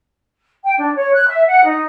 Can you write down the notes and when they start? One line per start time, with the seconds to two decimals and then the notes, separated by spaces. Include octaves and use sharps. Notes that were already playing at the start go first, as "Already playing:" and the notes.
0.65 G5
0.77 D4
0.95 C#5
1.14 F#6
1.28 E5
1.47 F#5
1.63 D#4